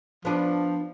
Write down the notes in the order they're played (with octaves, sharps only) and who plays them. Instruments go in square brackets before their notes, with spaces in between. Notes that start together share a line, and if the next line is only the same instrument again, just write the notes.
[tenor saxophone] F3 [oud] B3 D4